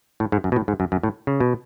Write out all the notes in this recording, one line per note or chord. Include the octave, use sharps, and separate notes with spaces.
A2
G#2
F#2
B2
A2
G#2
F#2
F#2
A2
C#3
B2